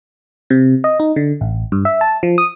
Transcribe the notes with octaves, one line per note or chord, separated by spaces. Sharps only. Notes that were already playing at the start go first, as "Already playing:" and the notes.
C3
D#5
D#4
D3
A1
G2
E5
A5
F3
D#6